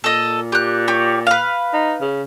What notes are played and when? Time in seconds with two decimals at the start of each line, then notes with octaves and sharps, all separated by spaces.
0.04 A#2 A4 D#5
0.52 G4 F#6
0.88 G4 C#5
1.27 B4 F5
1.73 D#4
2.01 C#3